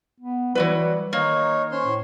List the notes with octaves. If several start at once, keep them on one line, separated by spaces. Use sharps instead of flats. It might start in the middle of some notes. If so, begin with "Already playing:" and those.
B3
E3 F#3 G3 B4
D#3 A#3 D#4 C#5
C#4 C5 C#5 C6
A2